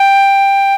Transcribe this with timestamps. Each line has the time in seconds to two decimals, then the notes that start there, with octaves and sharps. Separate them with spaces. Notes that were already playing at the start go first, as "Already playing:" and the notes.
Already playing: G5